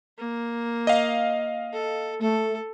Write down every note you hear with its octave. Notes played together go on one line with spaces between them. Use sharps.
A#3
D#5 F5
A4
A3 A4